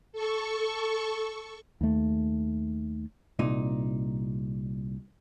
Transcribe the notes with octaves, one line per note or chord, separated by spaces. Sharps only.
A4 C#6
D#2 A3
C2 A#2 D#4